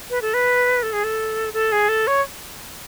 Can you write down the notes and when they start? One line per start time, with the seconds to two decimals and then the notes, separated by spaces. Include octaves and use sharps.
0.10 B4
0.22 A4
0.34 B4
0.83 A4
0.93 G#4
1.04 A4
1.54 A4
1.72 G#4
1.89 A4
2.07 C#5